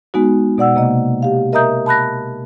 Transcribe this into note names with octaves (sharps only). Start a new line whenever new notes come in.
G#3 B3 D#4 F#4
B2 D5 F#5 E6
C3 A#3 D#5
G4 F5
A#4 D#5 E5 A#5 D#6 G6
A5 B5 F#6 A#6